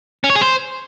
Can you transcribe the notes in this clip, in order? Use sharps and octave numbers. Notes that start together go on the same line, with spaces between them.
C#4
C#5
G#4
C5